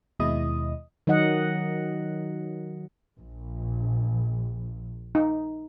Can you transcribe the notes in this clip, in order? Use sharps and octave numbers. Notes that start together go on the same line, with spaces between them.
D#2 B2 G#3 E4 D#5 D#6
D#3 F#3 D#4 D#5 F#5
A#1
D#4